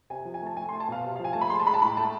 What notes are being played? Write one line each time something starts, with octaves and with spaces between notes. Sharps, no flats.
C3 G#5
F3
G#5
A3 A5
A3 G#5
C6
A3
A5
B2 F5
C3
F5
F3 G#5
A3 A5
B5
G#3 C6
A5
G#3 B5
A5
A2 B5
A3 A5